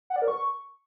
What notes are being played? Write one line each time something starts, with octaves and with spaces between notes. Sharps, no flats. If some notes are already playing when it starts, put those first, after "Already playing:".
F#5
D5
A#4
C#6